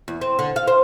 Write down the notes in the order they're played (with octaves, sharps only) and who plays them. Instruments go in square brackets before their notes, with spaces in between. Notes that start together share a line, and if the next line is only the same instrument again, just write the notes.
[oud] E2
C4
D3
F5
C5